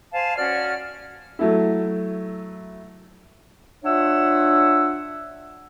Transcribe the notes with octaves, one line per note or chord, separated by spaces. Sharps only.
C5 F5 G#5 A5
C#4 F#4 D5 F6
F#3 A3 E4
D4 F4 C#5 E5 F#5 E6